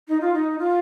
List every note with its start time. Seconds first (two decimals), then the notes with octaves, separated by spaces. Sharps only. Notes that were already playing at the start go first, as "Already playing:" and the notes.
0.08 D#4
0.21 F4
0.34 D#4
0.59 F4